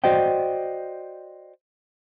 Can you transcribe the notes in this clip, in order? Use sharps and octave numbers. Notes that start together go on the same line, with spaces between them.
F#4 C5 D5 D#5 G5